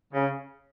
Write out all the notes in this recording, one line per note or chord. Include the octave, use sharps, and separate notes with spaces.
C#3